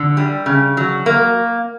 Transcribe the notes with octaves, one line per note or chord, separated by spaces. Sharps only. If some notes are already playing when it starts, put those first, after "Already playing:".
Already playing: D3
G3
C#3
F#3
A#3